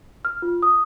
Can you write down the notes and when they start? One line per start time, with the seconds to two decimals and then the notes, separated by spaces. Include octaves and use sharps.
0.25 F6
0.42 F4
0.63 D#6